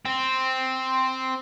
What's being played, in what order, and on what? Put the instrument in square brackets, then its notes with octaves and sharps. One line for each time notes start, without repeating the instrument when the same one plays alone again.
[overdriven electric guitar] C4